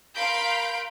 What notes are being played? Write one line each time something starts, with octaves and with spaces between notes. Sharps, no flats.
A#4 F5 B5 C6 G6 D7